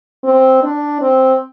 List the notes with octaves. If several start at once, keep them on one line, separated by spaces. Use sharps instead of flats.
C4
D4
C4